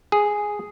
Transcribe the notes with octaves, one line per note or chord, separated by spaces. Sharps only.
G#4